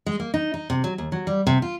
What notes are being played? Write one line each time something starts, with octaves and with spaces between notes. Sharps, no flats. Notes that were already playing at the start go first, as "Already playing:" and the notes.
G#3
A#3
D#4
D#4
C3
F#3
D#2
F#3
G3
C3
F4